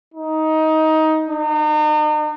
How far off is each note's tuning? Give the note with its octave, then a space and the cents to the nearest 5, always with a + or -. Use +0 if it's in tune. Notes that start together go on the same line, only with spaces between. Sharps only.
D#4 +15
D#4 -40